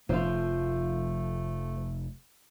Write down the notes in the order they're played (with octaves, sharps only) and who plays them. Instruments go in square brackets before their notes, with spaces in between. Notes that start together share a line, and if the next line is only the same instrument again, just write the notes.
[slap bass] F1 [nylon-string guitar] F3 F4 [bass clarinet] A3